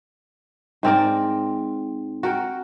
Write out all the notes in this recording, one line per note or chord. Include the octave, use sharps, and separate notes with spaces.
G#2 C4 A#4 D5
F#4 A#4 G5